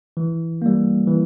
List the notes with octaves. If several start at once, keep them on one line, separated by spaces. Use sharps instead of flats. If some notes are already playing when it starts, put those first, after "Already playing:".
E3
G3 A#3
E3